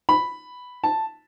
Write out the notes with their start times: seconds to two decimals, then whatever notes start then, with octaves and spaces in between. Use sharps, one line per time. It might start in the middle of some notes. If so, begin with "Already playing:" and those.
0.09 B5
0.84 A5